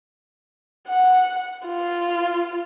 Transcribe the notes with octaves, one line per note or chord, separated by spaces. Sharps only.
F#5
F4